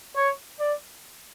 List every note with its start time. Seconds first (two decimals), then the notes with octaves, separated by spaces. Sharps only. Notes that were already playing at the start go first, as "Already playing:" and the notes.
0.16 C#5
0.60 D5